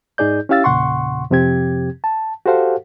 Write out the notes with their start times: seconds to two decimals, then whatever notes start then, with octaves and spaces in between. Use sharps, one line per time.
0.18 G#2 D#4 G#4 D5 G6
0.49 C#4 E4 G4 F5 E6 A6
0.64 E2 A#2 C#3 F#5 C6 C#6
1.30 F2 C3 F3 C4 G4 G#6
2.04 A5
2.46 F#4 G4 A4 C5 F5 F#5